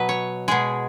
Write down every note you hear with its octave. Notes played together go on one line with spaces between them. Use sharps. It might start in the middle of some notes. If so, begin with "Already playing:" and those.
Already playing: B2 F#3 B4 D#5
C#5
B2 G#3 G#4